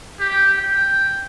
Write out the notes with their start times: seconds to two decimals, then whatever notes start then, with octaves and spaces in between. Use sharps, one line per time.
0.19 G4
0.58 G5